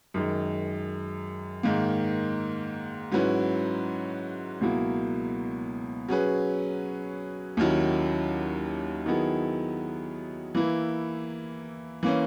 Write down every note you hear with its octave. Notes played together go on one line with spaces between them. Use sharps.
F#2 D#3 G#3
G#2 D#3 A#3
G#2 F#3 C#4 E4 B4
C#2 B2 F#3 A#3 E4
F#3 C#4 G#4 B4
D#2 D#3 F#3 C#4 E4
D#3 F#3 B3 E4 G#4
E3 A#3 E4
E3 A#3 C#4